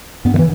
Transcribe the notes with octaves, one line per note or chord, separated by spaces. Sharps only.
G2 B3
D#3
E3